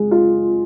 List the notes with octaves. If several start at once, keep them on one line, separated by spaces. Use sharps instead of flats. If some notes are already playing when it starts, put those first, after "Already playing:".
Already playing: G#3
F4